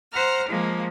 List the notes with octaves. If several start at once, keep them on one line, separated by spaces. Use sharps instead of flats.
C5 F#5 A#5 F6
F3 G#3 A#3